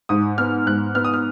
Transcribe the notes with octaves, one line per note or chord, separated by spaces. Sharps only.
G#2 D#6
B3 F6
G#2 F#6
B3 F6
D#6
F6